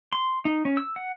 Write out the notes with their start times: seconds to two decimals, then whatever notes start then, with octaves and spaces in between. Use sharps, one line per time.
0.13 C6
0.45 D#4
0.65 C#4
0.77 E6
0.96 F#5